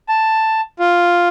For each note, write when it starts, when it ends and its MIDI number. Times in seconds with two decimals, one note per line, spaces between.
0.09 0.61 81
0.79 1.29 65